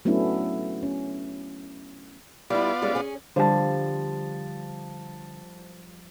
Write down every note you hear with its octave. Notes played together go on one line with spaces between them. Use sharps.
F#3 A3 B3 C#4 D4 E4
C#4
G3 B3 E4 F4 D5
G3 G#3 C#4
C#4 G#4
D3 F3 G3 C5 A5